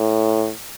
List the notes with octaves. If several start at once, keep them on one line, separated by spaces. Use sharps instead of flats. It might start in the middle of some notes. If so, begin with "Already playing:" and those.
Already playing: A2